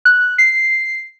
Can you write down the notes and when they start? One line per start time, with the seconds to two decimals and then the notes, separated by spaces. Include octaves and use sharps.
0.05 F#6
0.38 C7